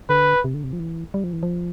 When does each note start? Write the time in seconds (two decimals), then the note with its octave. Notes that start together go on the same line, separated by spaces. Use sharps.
0.09 D3 B4
0.44 C3
0.54 D3
0.64 C3
0.73 F3
0.79 E3
1.14 G3
1.24 F3
1.33 E3
1.43 F3